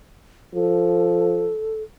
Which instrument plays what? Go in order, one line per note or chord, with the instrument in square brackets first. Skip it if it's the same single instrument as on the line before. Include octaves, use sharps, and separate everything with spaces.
[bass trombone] F3 [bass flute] A4